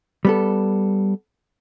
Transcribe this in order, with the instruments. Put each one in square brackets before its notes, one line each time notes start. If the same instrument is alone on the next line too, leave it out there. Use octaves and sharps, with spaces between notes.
[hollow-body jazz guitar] G3 B3 A4